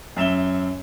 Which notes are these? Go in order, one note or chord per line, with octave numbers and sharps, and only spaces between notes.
F#2 E5 E7 G7